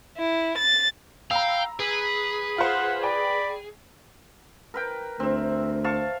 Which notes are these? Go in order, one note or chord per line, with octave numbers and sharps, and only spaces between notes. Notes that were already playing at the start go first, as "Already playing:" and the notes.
E4
A6
F5 G5 A#5 B5 E6
G#4 B4
F4 C5 F5 F#5
D5 G5 B5
A#4 B4 G5
D2 C4 E5
F5 A5 C#6